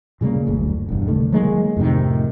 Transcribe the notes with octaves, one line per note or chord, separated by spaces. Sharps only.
A#2 C#3 G3 A#3
F#1 D2
E1 G2
C2 D3 D#3 A3
D#3 F#3 G#3 A#3
F2 A2 C3 D#3